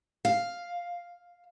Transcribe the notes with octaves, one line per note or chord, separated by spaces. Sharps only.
F5